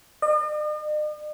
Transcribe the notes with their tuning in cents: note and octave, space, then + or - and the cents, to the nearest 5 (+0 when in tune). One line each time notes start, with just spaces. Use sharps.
D#5 -45